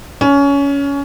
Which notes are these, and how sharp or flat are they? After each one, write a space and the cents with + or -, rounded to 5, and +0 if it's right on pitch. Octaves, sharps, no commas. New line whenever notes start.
C#4 +20